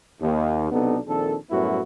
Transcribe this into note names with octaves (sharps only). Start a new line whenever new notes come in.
D#2
B1 C3 B3 D4 D#4 A4
A#1 D#3 C4 D4 A4
F#2 A2 G3 B3 E4 F#4